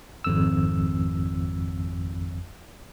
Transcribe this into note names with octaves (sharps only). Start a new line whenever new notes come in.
G#1 F2 E6